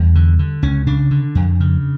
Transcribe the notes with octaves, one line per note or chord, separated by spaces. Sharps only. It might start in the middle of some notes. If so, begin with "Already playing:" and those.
Already playing: E2 G3
D3
D3
C#2 C#4
C#3 D4
D3
F2
C#3